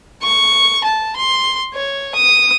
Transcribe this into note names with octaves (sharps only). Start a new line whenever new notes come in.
C#6
A5
C6
C#5
D#6